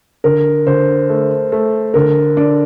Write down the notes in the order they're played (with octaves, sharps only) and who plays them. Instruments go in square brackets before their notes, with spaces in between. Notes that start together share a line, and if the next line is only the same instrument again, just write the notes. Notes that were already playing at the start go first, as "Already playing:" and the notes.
[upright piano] D3 [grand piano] A#4
[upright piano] D3 [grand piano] C5
[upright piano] A3
A3
[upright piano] D3 [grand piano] A#4
[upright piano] D4